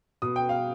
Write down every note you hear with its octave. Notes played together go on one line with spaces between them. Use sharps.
B2 D#6
G5
F5